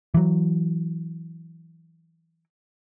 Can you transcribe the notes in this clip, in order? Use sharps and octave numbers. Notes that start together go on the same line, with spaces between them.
E3 F#3